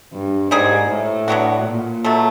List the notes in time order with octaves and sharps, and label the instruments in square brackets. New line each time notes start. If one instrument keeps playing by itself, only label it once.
[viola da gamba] G2
[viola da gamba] G#2 [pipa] G3 A#3 D#4 G#4
[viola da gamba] A2
[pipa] F#3 B3 D4 F#4
[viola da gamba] A#2
[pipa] B2 F#3 A3